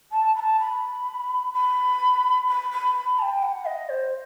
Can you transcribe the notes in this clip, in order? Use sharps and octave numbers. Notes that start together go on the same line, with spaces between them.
A5
B5
A5
B5
B5
B5
B5
B5
A5
G5
F#5
D#5
C5